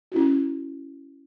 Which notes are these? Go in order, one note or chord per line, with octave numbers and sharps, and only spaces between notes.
C#4 E4 F#4